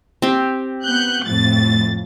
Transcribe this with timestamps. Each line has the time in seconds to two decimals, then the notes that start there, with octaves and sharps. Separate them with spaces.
0.22 C4 G4
0.85 B3 F#6 G6
1.23 F2 A2 A6